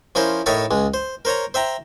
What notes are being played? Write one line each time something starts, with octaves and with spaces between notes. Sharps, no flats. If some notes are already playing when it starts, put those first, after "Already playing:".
F3 C#4 E4 A#4 C5
A2 D#4 A#4 C#5 E5 A5
C#2 G#3
C5
A#4 C5 C#5 A#5
C5 E5 G5 A#5